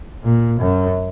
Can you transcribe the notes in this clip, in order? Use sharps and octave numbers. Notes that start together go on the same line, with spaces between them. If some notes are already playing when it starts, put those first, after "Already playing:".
A#2
F#2